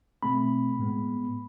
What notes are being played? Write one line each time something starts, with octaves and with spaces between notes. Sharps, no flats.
B2 A3 C4 B5
A2 G#3 B3